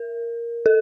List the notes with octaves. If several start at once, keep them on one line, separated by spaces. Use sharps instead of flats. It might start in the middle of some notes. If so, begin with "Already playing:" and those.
Already playing: A#4
A4